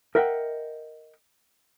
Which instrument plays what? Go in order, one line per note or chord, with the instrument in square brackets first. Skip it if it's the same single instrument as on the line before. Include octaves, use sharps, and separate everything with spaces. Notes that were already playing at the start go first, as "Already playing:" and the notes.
[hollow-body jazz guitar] A#4 D#5 E5 F#5 G5